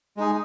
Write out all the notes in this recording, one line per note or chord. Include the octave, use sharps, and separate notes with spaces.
G#3 D#4 G#4